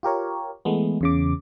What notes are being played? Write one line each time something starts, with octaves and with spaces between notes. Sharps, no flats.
F4 G4 A#4 C#5
E3 G#3 A3 B3
E2 C#3 D6